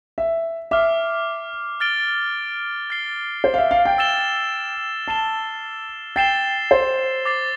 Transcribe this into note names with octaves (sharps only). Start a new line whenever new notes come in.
E5
E5 D6 F6 C7
F6 A6 D7 G7
F6 A6 C7 G7
C5
F5
E5
F5
G5
E6 A6 E7 G7
A5 A6 C7 E7 G7
G5 A6 C7 E7 G7
C5
D6 A6 C7